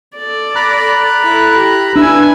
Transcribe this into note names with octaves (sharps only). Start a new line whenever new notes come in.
A4 D5
A#5 B5 F#6
E4 A4
G4
D4 E4 B4 G#5 E6